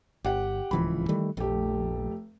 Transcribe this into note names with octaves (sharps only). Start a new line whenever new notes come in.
G1 G4 F#5 G5
D1 C#2 E3 F3 B5
D#3 G3 A3
F1 A#1 A3 G4